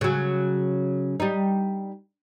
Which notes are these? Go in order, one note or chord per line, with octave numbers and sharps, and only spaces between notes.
C#3 F#3
G3 D#4